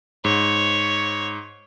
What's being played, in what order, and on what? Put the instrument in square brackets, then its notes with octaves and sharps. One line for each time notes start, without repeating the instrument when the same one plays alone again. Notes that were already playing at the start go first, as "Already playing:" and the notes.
[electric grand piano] G#2 [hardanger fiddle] C#5